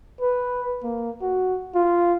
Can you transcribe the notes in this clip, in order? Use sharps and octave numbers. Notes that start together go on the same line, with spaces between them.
B4
A#3
F#4
F4